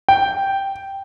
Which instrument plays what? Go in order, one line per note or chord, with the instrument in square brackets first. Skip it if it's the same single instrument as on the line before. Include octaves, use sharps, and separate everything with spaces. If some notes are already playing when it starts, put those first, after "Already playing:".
[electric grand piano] G5